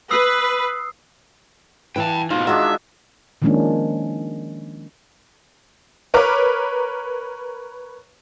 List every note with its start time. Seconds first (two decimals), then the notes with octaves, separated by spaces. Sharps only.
0.11 B4 D#6 E6 C7
1.96 E3 E4 B4 G5 A5
2.30 G#2 B2 D#4 F4
2.47 D#3 G#3 D4 F#4 D5 E5
3.42 D#3 F3 G#3 A#3 C#4 D4
6.14 A#4 B4 C#5 D6 F6